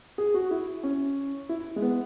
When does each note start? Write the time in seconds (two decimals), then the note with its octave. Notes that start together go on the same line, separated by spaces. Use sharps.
0.18 G#4
0.34 F#4
0.51 E4
0.83 C#4
1.49 E4
1.76 G#3
1.82 B3